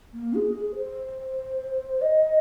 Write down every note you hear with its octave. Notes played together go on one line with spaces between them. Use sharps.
A#3
G#4
G#4
C5
D#5